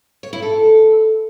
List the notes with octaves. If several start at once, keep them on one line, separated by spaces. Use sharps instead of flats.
C#5
E4
A4